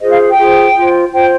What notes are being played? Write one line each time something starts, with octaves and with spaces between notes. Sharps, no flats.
F4 G#4 C5 D#5
F5
G5
F4 G#4 C5
F4 C5
F4 C5 G5